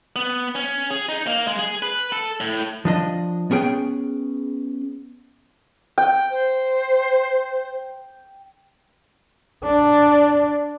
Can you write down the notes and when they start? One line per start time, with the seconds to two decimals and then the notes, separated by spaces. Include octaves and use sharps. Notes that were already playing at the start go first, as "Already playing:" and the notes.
0.16 B3
0.55 C#4
0.90 G#4
1.09 D#4
1.27 A#3
1.47 G#3
1.59 G#4
1.83 B4
2.12 A4
2.41 A2
2.85 F3 D4 D#5
3.51 B3 C#4 G#4 G5
5.98 G5
6.31 C5
9.63 D4